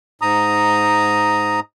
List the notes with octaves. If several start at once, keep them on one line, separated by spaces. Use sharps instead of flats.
G#2 A#5 D#6